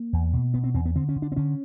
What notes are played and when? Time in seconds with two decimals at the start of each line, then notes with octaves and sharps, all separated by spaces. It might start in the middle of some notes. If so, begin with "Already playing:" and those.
Already playing: A#3
0.13 E2
0.33 B2
0.54 B2 B3
0.64 C4
0.74 E2 C4
0.86 B3
0.95 D3 C4
1.09 C#4
1.16 D3
1.22 D4
1.32 C4
1.36 D3 C#4